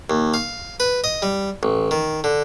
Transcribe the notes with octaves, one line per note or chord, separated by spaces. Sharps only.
D#2
F5
B4
D#5
G3
A1
D#3
D3